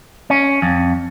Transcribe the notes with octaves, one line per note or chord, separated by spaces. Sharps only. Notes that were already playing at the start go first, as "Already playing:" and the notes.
C#4
F2